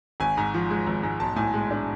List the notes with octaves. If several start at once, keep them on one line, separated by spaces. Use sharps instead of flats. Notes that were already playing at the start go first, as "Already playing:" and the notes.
G#1 G#5
G#2
F3
G#3
G#1
G#2
B1 A5
A2 G#5
G#3
D4